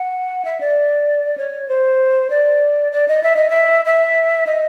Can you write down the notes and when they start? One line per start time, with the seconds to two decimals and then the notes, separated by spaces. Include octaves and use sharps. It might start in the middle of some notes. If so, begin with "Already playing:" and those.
Already playing: F#5
0.45 E5
0.61 D5
1.37 C#5
1.68 C5
2.30 D5
2.92 D5
3.08 D#5
3.23 E5
3.36 D#5
3.50 E5
3.85 E5
4.47 D#5